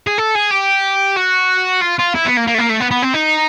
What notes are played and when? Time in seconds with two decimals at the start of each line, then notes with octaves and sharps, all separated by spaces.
0.07 G#4
0.18 A4
0.35 G#4
0.51 G4
1.17 F#4
1.82 F4
1.99 F4
2.15 E4
2.26 B3
2.37 A#3
2.47 A#3
2.55 A3
2.59 A#3
2.70 A3
2.80 B3
2.91 B3
3.02 C4
3.14 D#4